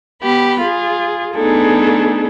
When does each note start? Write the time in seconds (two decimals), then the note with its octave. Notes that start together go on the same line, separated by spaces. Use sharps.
0.21 B3 G4 B5
0.59 F4 G#4
1.34 A3 B3 D4 D#4 G#4 A4